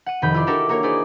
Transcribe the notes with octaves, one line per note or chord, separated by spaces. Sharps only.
F#5 D#7
F1 D#3 B5 G6
E4 F4 D5
D4 F#4 G4 A4 A#4
A#3 F#4 A#4 C#5
D#4 E4 G#4 C5 D5